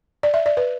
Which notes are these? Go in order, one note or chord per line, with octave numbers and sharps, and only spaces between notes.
D5
E5
D5
B4